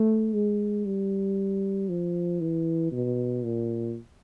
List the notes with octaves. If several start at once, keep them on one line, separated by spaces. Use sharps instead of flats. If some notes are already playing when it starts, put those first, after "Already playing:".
Already playing: A3
G#3
G3
F3
E3
B2
A#2